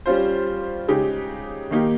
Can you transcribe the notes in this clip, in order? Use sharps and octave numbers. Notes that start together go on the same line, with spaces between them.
G3 C#4 F4 C5
C#3 G#3 D#4 G4
D#3 A#3 D#4 G4